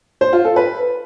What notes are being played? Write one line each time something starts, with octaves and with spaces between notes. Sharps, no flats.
C5
F4
A4
B4